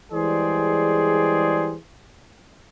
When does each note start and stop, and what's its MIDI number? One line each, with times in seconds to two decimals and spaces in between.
0.12 1.74 52
0.12 1.74 55
0.12 1.74 56
0.12 1.74 68
0.12 1.74 72
0.12 1.74 74